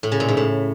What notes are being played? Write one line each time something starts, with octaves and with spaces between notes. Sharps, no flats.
A2
C#3
A#2
G#2
A2